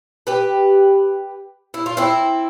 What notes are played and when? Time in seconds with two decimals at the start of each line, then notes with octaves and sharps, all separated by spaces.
0.27 G4 B4
1.74 E4
1.86 F4
1.97 C4 E4